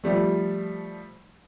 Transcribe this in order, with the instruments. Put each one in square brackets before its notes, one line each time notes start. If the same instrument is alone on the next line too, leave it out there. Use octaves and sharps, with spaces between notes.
[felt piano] F3 G3 A3